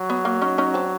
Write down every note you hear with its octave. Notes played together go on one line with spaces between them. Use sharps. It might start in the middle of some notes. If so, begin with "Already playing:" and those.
Already playing: F#3
B3
A#3
C#4 D#4
C#4 D#4
C4 D4